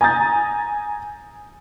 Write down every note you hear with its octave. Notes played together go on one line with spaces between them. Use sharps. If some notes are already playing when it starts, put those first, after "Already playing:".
G#5 A#5 D#6 G6 A6